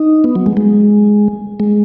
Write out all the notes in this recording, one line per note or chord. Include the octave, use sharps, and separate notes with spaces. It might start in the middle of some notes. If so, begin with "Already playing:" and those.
Already playing: D#4
B3
F#3
G#3
G#3
G#3